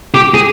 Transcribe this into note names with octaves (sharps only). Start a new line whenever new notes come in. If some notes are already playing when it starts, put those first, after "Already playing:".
G4
G#4